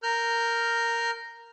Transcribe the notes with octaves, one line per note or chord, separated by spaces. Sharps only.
A#4 F6 G6